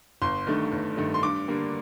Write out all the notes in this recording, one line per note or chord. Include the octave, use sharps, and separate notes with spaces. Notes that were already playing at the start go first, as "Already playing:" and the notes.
G1 C6
G2 D#3 A3
G1
G2 D#3 A3
C6
G2 D6
D3 G3 A#3